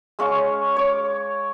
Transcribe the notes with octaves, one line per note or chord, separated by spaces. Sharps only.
G#3 C#4 F5 C#6
C#5 D6